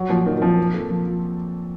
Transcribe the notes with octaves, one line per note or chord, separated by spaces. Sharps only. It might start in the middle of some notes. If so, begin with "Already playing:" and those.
Already playing: F#3
A#2 F3
A#2 D#3
D#3
F3 C4
A#3
A4
F3
F4